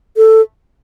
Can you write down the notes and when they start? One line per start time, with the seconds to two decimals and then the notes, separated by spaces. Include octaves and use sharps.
0.17 A4